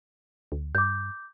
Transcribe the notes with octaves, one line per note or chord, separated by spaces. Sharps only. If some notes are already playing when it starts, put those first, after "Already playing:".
D2
G2 D6 G6